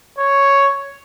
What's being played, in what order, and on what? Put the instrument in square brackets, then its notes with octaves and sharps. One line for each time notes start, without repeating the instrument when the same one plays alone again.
[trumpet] C#5